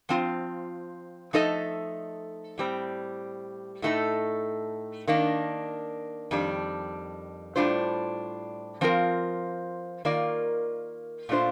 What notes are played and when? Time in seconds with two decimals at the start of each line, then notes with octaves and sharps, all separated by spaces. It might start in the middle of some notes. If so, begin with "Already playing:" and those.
0.09 F3 C4 F4
1.33 F3 A3 D#4 A4 D#5
2.58 A2 G3 C4
3.82 A2 A3 D#4 A4
5.08 D#3 A#3 D4
6.31 F2 D#3 G3 D4
7.56 A2 G3 D4 F4 C5
8.81 F3 C4 F4 A#4
10.05 D#3 A#3 F4 A#4 D5
11.29 A#2 A3 D4 F4 C5